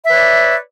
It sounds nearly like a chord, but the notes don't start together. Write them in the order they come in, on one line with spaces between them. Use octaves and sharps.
E5 B4 C#5 D5